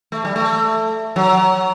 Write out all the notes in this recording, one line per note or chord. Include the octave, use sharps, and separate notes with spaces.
A3
G3
A3
F#3